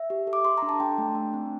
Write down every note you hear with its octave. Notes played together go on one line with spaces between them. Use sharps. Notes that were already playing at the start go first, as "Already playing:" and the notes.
Already playing: E5
G4
A4
D6
A4 C6
D4 A#5
A5
D4 G5
A3
D4
C4